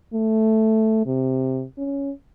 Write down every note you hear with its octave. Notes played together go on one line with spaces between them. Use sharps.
A3
C3
C#4